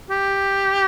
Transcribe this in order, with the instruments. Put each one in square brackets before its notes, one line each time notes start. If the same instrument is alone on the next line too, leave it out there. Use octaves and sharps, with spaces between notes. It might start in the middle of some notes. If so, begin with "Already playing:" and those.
[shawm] G4